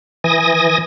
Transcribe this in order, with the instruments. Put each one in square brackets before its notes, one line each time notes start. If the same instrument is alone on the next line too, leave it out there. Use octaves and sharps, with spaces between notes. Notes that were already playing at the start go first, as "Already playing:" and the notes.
[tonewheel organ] E3 G#5 D#6 A#6